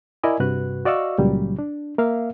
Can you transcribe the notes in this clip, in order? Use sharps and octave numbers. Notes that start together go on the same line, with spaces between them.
E4 A#4 D5 D#5 G#5
G2 C3 F#4 B4 F#6
F#4 D5 D#5 F5 C#6 E6
C#2 A#2 C#3 F#3 G3
D4
A#3 A#4 E5 F5